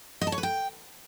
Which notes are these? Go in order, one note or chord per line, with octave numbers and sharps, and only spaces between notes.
D#5
A5
C#5
B4
G5